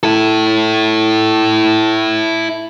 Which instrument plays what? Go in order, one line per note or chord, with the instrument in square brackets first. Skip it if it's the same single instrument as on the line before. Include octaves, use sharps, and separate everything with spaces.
[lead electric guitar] E4 A4